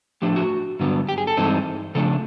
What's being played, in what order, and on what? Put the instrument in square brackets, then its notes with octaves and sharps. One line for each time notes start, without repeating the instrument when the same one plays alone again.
[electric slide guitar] A2 F3 A3 D4 G4
F#4
G2 D3 F#3 B3
G4
G#4
A4
G2 E3 G#3 C4 D#4
C#3 F3 A3 D4 A4